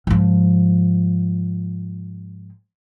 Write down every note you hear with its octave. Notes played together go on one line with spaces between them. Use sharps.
G#2 F3